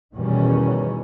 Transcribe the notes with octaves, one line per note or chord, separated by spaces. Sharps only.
E2 B2 D#3 E3 G3 C#4